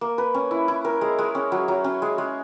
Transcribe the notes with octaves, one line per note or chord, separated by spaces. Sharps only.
A#3
B4
C#4
E4
E4
A#4
G#3
G#3
C#4
F#3
F#3
C#4
G#3
G#3